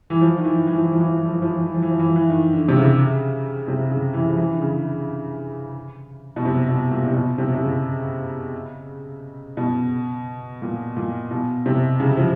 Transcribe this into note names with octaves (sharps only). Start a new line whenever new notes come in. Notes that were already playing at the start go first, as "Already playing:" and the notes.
E3
F3
D#3
E3
E3
F3
E3
F3
E3
F3
E3
F3
E3
F3
E3
F3
E3
F3
E3
F3
E3
F3
E3
D#3
D3
C3
C#3
C3
C#3
E3
F3
E3
D3
C#3
B2
C3
B2
A#2
C3
B2
C3
C3
C#3
B2
A#2
A#2
B2
C3
C#3
F3